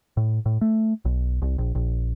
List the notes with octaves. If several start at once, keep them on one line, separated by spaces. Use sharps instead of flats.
A2
A2
A3
B1
C2
A#1
A#1